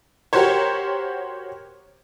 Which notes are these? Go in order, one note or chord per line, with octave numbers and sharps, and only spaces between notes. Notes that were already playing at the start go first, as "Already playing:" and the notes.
F#4 G4 A#4 C5 C#5